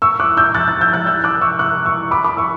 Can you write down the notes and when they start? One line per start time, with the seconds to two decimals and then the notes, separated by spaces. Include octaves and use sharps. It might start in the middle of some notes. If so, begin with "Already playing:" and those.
0.02 C#6 E6
0.20 D6 F#6
0.37 E6 G6
0.54 F#6 A6
0.68 F#6 A6
0.81 E6 G6
0.93 F#6 A6
1.06 E6 G6
1.24 D6 F#6
1.41 C#6 E6
1.59 D6 F#6
1.85 C#6 E6
2.11 B5 D6
2.24 B5 D6
2.37 C#6 E6